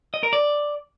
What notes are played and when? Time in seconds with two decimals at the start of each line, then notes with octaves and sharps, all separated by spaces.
0.14 D#5
0.23 A#4
0.33 D5